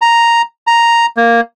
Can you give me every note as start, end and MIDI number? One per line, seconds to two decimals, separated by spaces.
0.02 0.42 82
0.67 1.06 82
1.17 1.40 58